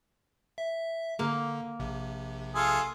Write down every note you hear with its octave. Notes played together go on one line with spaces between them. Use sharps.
E5
D3 A#3
A#1 C3
F4 G#4 A4